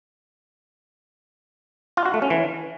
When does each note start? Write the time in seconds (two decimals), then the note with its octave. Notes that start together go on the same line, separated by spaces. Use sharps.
1.97 F4
2.05 F#4
2.14 A3
2.22 C#4
2.30 E3